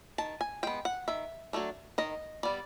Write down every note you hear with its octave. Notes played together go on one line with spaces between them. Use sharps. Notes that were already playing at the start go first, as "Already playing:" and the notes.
D#3 A5
G#5
G#3 B3 G5
F#5
D#3 E5
F#3 A3 D4
D#3 D#5
G3 B3 D5